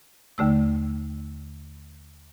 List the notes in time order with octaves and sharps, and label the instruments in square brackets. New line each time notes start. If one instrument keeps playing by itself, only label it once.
[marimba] D#2 D3 A3 E6